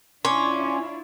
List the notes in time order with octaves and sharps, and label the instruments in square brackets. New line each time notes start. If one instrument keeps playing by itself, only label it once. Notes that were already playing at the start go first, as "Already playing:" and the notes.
[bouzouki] C#4 [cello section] D4 E4 F4 [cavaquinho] C#5 [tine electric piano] C6 D6